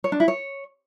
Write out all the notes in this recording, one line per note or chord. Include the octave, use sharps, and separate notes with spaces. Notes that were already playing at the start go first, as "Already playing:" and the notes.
C#5
D4
E4
C#5